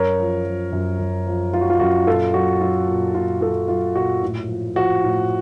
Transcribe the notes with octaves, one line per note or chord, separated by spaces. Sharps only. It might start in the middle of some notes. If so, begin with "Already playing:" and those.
Already playing: F#2 A#4 C#5
F3
F3
F#2
F#2
F3
F3 F4
F#4
F4
F#2 F#4
A#2 F4 A4
F#3 F#4
F#3 F4
A#2
A#2 F4
F#3 F4 A4
F#3 F4
A#2 F#4
A2
F3
F3 F#4
A2